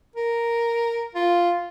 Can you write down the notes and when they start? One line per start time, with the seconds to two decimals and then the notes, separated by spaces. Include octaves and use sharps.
0.16 A#4
1.15 F4